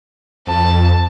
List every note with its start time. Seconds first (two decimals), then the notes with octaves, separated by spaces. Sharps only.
0.47 F2 A5